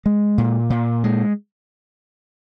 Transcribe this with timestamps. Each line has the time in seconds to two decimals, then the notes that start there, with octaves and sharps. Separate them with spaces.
0.06 G#3
0.38 A#2
0.70 A#2
1.04 G#3